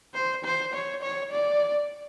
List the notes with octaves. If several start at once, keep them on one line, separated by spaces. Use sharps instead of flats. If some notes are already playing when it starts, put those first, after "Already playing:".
C5
C5
C#5
C#5
D5